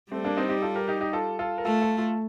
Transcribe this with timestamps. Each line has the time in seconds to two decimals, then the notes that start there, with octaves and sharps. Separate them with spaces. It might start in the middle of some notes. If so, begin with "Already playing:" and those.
0.11 G3 A3 C4
0.25 A#3 D4
0.37 C4 D#4
0.49 D#4 G4
0.62 F4 A4
0.75 G4 A#4
0.88 D#4 G4
1.01 D#4 G4
1.13 F4 A4
1.39 F4 A4
1.58 A#4
1.65 A3 F4 A4
1.82 F4 A4
1.98 F4 A4